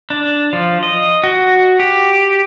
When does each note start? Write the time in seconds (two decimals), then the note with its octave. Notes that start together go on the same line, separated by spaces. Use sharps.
0.10 D4
0.53 F3
0.83 D#5
1.24 F#4
1.80 G4